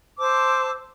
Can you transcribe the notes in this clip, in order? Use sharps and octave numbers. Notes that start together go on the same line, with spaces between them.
C5 A5 D6 E6